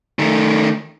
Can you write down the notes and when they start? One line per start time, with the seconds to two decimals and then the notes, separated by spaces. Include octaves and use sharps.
0.19 D#3 A3